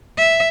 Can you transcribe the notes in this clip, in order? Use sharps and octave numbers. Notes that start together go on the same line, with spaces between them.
E5